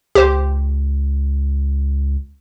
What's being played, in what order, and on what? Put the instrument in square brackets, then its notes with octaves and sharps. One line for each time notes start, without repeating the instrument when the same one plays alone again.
[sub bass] C#2 [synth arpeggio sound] G4 C5